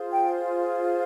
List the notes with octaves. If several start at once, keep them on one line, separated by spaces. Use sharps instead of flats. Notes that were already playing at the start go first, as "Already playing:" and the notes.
Already playing: F4 G#4 C5
G5